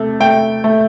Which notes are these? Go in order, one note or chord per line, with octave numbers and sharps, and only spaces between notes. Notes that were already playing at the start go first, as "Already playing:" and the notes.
Already playing: C3 A3
A3 G5
A3